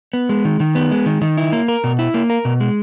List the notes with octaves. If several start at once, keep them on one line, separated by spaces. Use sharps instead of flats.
B3
G#3
D#3
D#3
B3
G#3
D#3
D#3
E4
A#3
A#4
B2
E4
A#3
A#4
B2
G#3